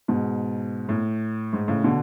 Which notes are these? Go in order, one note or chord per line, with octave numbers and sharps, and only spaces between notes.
G#2 B2
A2
G#2
A2 C#3
B2 D3